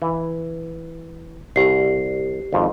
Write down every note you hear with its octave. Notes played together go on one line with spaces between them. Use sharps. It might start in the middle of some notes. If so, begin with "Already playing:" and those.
E3
C2 G4 C7
G#1 F2